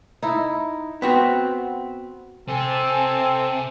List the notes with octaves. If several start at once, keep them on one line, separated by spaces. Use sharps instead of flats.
D#4 E4
B3 C4 F#4
C3 C4 A4 G#5